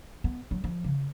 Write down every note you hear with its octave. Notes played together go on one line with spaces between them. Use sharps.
B3
F#3
F3
C#3